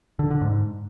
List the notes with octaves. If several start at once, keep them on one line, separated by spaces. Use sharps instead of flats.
D3
D3
G#2